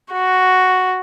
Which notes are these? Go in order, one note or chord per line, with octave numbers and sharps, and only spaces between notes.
F#4